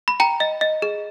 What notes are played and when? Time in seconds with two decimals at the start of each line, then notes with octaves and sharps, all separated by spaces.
0.08 B5
0.20 G5 A#5
0.40 D#5
0.61 D#5
0.82 G#4